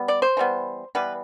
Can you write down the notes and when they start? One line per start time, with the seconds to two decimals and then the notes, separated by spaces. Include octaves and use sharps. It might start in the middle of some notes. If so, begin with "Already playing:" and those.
Already playing: G3 B3
0.08 D5
0.22 C5
0.37 E3 G3 B3
0.95 E3 G3 B3 B4